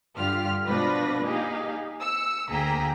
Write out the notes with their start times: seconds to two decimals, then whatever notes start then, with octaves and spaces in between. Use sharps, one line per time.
0.15 G2 D3 F4 G4 F6
0.68 B2 F3 D4 B4 A#6
1.24 A#3 D#4 G4 G#4 F5
2.00 E6 C#7
2.48 D2 A#3 G#4 G5 A#5 B6